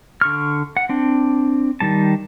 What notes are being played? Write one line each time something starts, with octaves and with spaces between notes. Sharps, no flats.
D3 C#6 F6
F#5
C4 D4
D#3 G3 A5